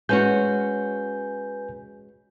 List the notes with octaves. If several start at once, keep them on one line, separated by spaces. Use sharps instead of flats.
G#3 C#4 F#4 B4 G#5 G6